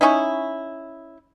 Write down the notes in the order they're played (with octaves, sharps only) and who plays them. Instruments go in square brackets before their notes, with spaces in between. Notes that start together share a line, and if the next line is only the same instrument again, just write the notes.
[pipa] C#4 D#4 E4